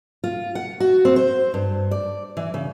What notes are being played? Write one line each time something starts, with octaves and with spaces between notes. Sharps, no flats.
F4
F#5
F#4
C4
C5
G2
D5
E3
C#3